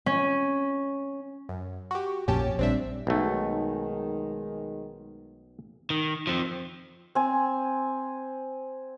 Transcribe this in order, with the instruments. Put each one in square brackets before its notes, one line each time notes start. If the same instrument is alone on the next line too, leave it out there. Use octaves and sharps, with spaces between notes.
[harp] C#4
[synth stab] F#2
F#4 G4
[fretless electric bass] A#1 F2 A#2 [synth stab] C#4 G4 A5
[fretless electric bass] A#1 E3 G3 [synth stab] C4 D4 E5
[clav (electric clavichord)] B1 A3 [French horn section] D#3 G#3
[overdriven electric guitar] D#3
F3 C4
[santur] C4 G#5